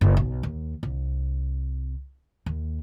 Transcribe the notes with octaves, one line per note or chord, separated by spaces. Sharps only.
F#1
B1
D#2
C2
D#2